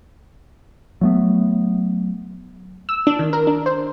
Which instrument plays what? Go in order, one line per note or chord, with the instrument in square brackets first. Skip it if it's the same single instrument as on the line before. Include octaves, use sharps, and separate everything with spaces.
[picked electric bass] F#3 A3 B3
[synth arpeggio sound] E6
D4
D#3
A#4
D4
C5